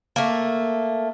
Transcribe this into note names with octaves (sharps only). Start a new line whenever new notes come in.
A3 A#3